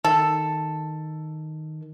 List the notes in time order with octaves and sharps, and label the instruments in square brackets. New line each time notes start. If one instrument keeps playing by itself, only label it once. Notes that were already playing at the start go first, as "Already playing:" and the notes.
[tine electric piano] D#3 [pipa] A4